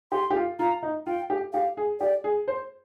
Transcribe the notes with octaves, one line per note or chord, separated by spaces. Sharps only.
G4 C6
G4
F4
F4 A#5
D#4
F4 G5
G4
G4 F5
G#4
G4 D5
G#4
C5